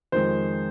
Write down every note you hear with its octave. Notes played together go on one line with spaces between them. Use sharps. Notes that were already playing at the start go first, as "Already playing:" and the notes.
F2 D#3 G#3 C5